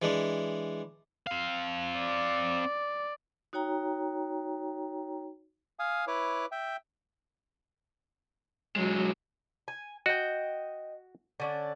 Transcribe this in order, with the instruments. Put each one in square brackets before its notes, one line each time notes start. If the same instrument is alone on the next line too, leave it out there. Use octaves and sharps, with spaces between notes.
[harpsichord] E3 G#3 D4
[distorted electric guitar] C4 F5
[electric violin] D5
[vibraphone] D#4 F#4 C#5 G5 A#5
[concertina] F5 G#5 D#6
E4 B4 C#5 D6
E5 G5
[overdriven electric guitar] B1 G#3 [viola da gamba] F#3
[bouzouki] G#5
[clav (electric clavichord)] F#4 [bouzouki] D#5 G5
[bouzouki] D3 C#4 D4